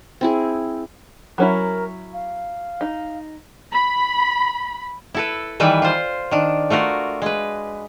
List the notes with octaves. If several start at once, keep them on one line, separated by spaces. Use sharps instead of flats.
C4 E4 G#4
F#3 C#4 E4 A#4
F5
D#4
B5
E4 A4 B4
D#3 E3 G3 B4 E5
F4 C5
D#3 D4
A3 F4 F#4 A#4
G#3 B4